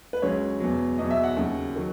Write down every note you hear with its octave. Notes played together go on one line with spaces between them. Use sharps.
B4
C#2 C#3 F#3 C#5
E2 B2 F#3
E2 B2 F#3 D#5
E5
F#5
D#2 C#3 F#3
D#3 F#3